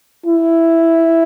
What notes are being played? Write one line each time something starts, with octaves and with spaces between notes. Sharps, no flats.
E4